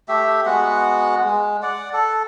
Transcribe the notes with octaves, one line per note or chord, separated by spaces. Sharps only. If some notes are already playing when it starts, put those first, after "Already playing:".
A3 G4 E5
G#3 B3 F#4 F#5
G#3
D5 F#5
A4